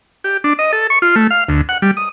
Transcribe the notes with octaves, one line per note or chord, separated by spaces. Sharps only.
G4
D4
D#5
A4
C#6
F4
A3
F5
D2
F#5
G3
D#6